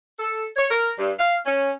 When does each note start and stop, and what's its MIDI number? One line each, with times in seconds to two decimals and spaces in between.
0.19 0.44 69
0.56 0.69 73
0.69 0.90 70
0.98 1.11 43
1.17 1.35 77
1.46 1.70 61